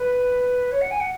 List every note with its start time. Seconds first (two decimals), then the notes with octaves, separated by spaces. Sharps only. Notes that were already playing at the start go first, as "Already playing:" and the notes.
Already playing: B4
0.72 C#5
0.81 F#5
0.91 G#5
1.00 F#5